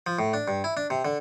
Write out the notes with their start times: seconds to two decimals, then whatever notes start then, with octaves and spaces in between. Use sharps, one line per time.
0.06 F3
0.19 A2
0.33 D4
0.48 G2
0.64 E4
0.77 D4
0.90 C3
1.05 D3